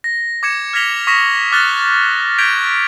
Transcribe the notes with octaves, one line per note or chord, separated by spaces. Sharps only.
A#6
D6 G#6 C#7 E7
F6 G#6 A#6 B6 F7 G7
C#6 D#6 A#6 B6 E7
D6 F6 F#6 A6 G7
G6 G#6 B6 D7 F7 G7